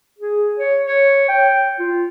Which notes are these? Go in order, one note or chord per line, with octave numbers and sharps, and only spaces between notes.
G#4
C#5
C#5
G5
F4